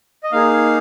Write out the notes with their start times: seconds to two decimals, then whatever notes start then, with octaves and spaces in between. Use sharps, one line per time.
0.23 D#5
0.32 A#3 D#4 G#4 F5